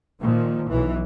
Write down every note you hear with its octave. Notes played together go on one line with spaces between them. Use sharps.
A#2 D#3 F3
B1 E3